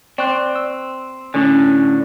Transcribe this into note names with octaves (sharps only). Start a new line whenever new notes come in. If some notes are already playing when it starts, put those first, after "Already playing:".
C4 D5 C#6 F#6
E6
A2 D3 C#4